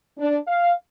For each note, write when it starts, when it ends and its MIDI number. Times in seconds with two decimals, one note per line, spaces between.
0.18 0.38 62
0.47 0.72 77